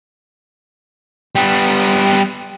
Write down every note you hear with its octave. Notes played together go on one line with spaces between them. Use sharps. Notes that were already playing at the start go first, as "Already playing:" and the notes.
G3 B3